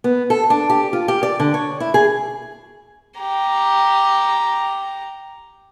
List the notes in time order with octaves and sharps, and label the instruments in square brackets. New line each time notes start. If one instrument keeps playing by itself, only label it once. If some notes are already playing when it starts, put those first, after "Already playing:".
[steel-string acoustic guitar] B3
A4
D4
G4
F4
G4
D5
D3
C#5
E4
G#4
[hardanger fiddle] G4 A#5